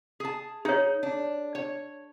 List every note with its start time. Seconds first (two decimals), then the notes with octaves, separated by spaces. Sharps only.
0.20 G#4 A5
0.65 D#4 G#4 C#5
1.03 D4
1.55 C#5